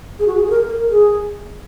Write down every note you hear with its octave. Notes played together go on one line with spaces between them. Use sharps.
G#4
F#4
G#4
G#4
A#4
A#4
G#4